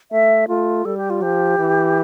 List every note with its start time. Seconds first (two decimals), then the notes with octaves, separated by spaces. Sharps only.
0.12 A3 E5
0.48 A3 F4
0.85 G3 A4
0.97 G4
1.10 F4
1.22 F3 G4
1.59 E3